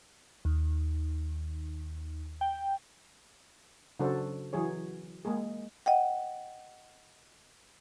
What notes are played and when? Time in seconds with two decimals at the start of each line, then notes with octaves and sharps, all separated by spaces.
0.45 D#2
2.41 G5
4.00 C#3 F#3 D4 F#4 A4 C5
4.53 E3 F#3 G#4 C#5
5.25 G#3 A#3 G#4
5.86 D#5 F#5 G5